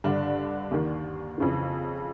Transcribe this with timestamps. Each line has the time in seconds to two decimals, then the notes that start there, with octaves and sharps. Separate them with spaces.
0.04 G2 D3 D4
0.71 D#2 D#3
1.38 F2 C#3 E3